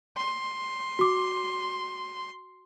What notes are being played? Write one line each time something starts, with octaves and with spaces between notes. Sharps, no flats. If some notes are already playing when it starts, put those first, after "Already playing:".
C6
F#4 D6